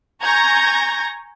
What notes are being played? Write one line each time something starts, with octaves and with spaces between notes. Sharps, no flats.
G#5 A#5 C#6 G6 G#6 A#6